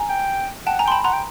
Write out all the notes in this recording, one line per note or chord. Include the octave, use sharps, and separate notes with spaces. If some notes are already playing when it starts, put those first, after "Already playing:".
Already playing: G#5 A#5
G5
F#5 G5 A5
G#5 A#5
G5 C6
A5 B5
F#5 A#5 C6
G5